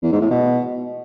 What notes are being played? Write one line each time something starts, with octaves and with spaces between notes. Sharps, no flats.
E2
G#2
A2
B2